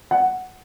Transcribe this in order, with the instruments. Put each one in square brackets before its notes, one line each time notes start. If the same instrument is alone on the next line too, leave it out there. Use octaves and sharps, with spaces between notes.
[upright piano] F#5